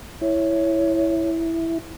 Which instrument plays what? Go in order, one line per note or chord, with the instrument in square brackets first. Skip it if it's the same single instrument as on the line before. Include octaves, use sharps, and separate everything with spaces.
[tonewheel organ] E4 [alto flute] C#5